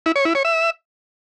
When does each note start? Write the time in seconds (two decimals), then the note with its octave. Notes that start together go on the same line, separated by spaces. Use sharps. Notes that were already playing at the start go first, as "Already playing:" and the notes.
0.06 E4
0.16 C#5
0.25 E4
0.35 C#5
0.45 E5